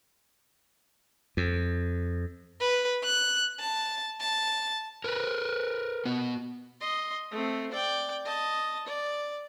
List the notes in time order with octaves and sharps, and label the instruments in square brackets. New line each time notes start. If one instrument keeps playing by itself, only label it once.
[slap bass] F2
[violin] B4
F#6
A5
A5
[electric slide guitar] A#4 B4
B3 F#4
[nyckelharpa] D#5 C6
A3 C4
D5 G5
D#5 A5
D5